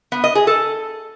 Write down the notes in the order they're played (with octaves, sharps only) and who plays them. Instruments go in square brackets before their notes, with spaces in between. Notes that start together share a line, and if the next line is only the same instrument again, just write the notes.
[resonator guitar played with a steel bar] B3
D#5
G#4
A4